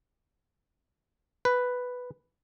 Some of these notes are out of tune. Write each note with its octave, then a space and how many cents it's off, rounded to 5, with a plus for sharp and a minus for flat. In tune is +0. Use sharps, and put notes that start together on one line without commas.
B4 +5